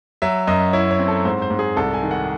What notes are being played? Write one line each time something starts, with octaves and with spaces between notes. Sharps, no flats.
F#3 E5
F#2 D#5
E4 C#5
C#5
C4
A4
G#2 C5
C5
G#2
G#4
C2 A4
G#5
D#3
F#5